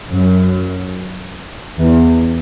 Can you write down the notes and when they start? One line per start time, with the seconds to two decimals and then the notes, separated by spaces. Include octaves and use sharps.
0.11 F#2
1.79 E2